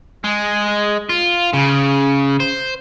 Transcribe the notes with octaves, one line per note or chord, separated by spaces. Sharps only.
G#3
F4
C#3
C5